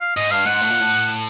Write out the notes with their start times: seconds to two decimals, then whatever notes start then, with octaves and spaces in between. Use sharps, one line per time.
0.01 F5
0.16 G#2 D#5
0.31 G2 F5
0.46 G#2 F#5
0.61 A2
0.70 A#2
0.80 A2